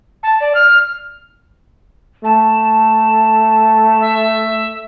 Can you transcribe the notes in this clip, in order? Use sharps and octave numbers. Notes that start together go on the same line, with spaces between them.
A5
D5
F6
A3 A5
E5